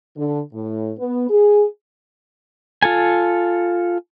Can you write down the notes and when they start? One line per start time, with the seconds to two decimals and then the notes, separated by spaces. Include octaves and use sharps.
0.16 D3
0.53 A2
0.97 B3
1.29 G#4
2.83 F4 A4 G#5